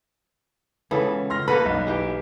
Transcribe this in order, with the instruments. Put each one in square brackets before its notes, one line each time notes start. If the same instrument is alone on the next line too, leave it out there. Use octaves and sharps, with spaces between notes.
[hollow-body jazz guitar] C#2 [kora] E3 B3 A4 [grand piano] C#4
[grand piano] C6 F6 A#6
[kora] A#3 F#4 A4 [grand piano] B4 [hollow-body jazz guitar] B5
[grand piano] B1
[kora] E3 G4